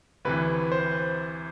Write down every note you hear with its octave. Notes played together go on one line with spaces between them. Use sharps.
D2 C3 E3 B4
C5